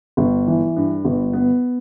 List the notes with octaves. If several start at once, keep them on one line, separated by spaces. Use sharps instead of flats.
G1
E3
G2
G1
B3